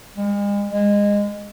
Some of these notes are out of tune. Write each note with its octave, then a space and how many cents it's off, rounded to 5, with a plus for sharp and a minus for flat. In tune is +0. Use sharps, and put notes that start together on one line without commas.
G#3 -40
G#3 -20